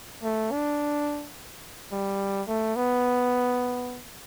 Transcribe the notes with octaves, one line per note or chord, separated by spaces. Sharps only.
A3
D4
G3
A3
B3